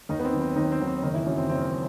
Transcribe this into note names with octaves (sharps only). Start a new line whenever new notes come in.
D#2 D#3 D#4
B3
C4
D#3 F#3
C4
D#2 D#3 D#4
C4
D#3 F#3
C4
F#1 D#3 D#4
E3 E4
F#2 F#3
C4
F#1 C4